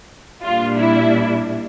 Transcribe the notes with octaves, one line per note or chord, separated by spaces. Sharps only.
A#2 G3 D4 F4
E4